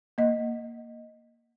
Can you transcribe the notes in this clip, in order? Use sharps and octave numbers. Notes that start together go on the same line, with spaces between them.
A#3 D#5